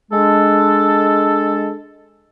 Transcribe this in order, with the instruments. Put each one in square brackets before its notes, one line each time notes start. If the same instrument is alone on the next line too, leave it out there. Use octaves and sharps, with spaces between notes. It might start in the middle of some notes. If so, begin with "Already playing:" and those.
[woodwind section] G#3 D4 A4